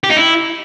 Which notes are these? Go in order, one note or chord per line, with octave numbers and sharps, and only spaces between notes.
G4
D#4
E4